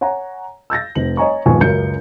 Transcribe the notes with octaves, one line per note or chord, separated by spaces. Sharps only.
C#5 F#5 G#5 A#5
E6 G6 A6 A#6
F1 C4 F#7
C#5 D#5 G#5 A#5 C#6
D#1 F2 G#2 B3 G#5 C#6
C#2 F#2 A#4 G6 C#7